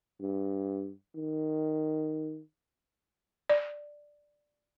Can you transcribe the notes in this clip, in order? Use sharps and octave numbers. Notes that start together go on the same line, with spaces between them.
G2
D#3
D5